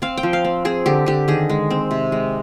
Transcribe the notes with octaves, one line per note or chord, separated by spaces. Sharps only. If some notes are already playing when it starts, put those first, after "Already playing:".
C4 F5
G5
F3
F5
C4
C4 G#4
D3 G4
D3 G4
D#3 G#4
G#3
C4
C3
G#3